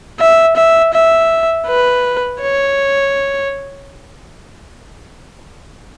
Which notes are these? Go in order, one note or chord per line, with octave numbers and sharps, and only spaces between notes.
E5
E5
E5
B4
C#5